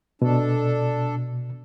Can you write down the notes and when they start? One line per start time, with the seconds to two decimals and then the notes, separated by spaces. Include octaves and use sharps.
0.22 B2 D4 A4